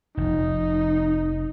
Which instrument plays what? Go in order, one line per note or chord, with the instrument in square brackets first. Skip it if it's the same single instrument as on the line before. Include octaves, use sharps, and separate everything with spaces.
[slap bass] F1 F3 [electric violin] D#4